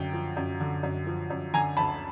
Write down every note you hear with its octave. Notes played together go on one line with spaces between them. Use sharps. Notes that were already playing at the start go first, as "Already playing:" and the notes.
Already playing: F#2 D3 G5
F3
F#2
D3
F#2
F3
F#2
D3 G#5 A#5
D2 A5 B5